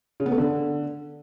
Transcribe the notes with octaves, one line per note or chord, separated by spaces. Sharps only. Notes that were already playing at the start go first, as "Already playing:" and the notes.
C#3
B3
A3
D3